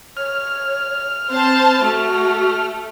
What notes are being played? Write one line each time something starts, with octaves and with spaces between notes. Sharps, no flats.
C#5 F6
C4 C5 A5
A3 F#4